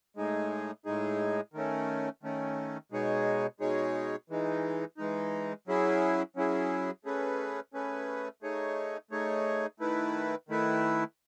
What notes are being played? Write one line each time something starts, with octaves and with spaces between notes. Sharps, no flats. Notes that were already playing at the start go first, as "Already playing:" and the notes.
A2 G#3 D#4 G#4
A2 G#3 D#4 G#4
D#3 A3 C#4
D#3 A3 C#4
B2 G#3 D#4 G#4 C#5
B2 G#3 D#4 G#4 C#5
E3 G#3 D#4
E3 G#3 D#4
F#3 C#4 E4 G#4
F#3 C#4 E4 G#4
A3 C#4 G#4 B4
A3 C#4 G#4 B4
A3 D#4 G#4 C#5
A3 D#4 G#4 C#5
D#3 A3 E4 B4
D#3 A3 E4 B4